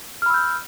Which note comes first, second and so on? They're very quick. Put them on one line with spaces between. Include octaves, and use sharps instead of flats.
F6 B5 E6 G6